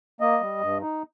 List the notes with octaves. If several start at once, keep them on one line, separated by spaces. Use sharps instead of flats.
A#3 D#5
G3
G2
D#4